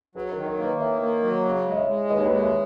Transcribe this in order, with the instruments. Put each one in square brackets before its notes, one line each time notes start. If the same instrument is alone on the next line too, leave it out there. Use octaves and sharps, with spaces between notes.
[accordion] F#3 [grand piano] G#4 B4
[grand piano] A#4 C#5
[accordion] D#3
[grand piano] A#4 C#5
[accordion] A#3
[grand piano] B4 D#5
[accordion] D#3 [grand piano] C#5 E5
[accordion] A#3
F#3
C#3
G#3
[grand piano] D#5
C#5 E5
[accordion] G#3
[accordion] D#2 [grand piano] B4 D#5
[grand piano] C#5
B4 D#5
[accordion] G#3
[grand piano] C#5 E5